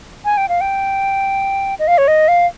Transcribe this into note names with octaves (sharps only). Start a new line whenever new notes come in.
G#5
G5
F5
G5
D#5
F5
C#5
D#5
F5